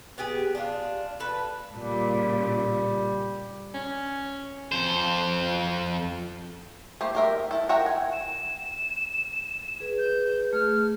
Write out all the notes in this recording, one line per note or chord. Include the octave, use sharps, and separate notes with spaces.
B3 G4 G#4
D4 F4
A4 B4
A#2 C#3 G3
C#4
F2 C5
A3 A#3 G4 C5
G4 A#4 E5
E4 A4
A#4 E5 F#5 G5 A#5
G#5
E7
G#4 B4
G6
A3 G#4 F6